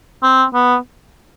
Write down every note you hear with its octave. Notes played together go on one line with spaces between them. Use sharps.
C4
B3